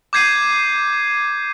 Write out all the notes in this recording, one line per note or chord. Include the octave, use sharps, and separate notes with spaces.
D6 G6 G#6 C7 D#7